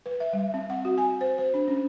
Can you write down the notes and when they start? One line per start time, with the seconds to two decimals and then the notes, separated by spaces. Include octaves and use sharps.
0.06 B4
0.20 E5
0.33 G3
0.54 C4
0.70 F#5
0.85 F#4
0.98 G#5
1.21 C5
1.38 C5
1.54 D4
1.68 C#4